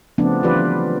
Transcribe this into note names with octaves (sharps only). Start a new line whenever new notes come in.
C#3 F3 A3 B3 C4 D4
E3 F#3 F4 G4 B4 D5